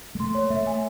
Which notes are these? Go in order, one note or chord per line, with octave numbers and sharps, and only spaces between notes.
G#3
A3 C6
C#5
A3 E5
G#5